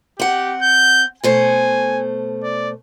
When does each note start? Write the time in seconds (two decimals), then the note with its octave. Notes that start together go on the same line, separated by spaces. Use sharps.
0.20 C4 G4 F#5
0.62 G6
1.24 B2 A3 C5 G#5
2.44 D5